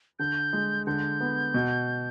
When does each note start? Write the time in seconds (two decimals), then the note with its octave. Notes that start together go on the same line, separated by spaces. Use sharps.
0.19 D3 G6
0.53 G#3
0.86 D3 G6
1.21 B3
1.54 B2